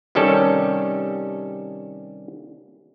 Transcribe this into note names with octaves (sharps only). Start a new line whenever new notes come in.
C3 D#3 G3 C#4 A4